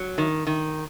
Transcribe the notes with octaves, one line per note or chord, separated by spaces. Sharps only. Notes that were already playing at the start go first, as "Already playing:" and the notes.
Already playing: F#3
D#3
D#3